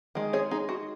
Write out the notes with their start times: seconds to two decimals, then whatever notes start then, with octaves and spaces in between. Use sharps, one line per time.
0.15 D#3 G#3
0.33 G#4 C#5
0.51 D#4 G#4
0.69 F#4